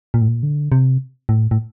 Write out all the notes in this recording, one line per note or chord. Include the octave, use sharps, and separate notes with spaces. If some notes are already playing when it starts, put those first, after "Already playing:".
A#2
A2
A#2
D3
C3
A2
A2